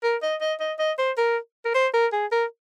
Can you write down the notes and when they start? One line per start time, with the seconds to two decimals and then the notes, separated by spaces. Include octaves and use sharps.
0.03 A#4
0.22 D#5
0.41 D#5
0.60 D#5
0.79 D#5
0.99 C5
1.18 A#4
1.65 A#4
1.75 C5
1.94 A#4
2.13 G#4
2.32 A#4